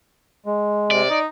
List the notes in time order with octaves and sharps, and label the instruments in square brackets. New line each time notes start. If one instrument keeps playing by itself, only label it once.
[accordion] G#3
[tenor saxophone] C3 [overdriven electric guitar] D5
[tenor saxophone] D#4